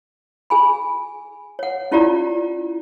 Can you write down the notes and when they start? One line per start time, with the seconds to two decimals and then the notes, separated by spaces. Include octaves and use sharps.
0.50 G#4 G#5 B5
1.59 C#5 F#5
1.92 C#4 E4 F4 G4 D5 A#5